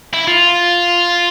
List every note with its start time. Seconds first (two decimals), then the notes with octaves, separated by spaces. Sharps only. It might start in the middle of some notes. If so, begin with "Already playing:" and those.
0.14 E4
0.27 F4